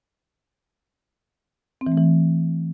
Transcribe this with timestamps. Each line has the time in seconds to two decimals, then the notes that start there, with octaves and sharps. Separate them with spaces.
1.81 C4
1.87 E3
1.92 A3
1.97 E3